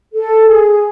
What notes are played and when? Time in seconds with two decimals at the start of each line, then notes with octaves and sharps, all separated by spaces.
0.13 A4
0.46 G#4